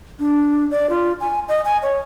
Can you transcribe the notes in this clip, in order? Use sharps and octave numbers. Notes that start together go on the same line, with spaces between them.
D4
D5
F4
G#5
D#5
G#5
C#5